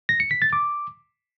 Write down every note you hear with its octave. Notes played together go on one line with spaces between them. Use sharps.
A#6
C#7
B6
A6
D6